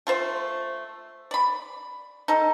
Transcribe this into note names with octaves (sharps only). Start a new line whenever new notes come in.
A3 F4 C5
D5 B5
D#4 A4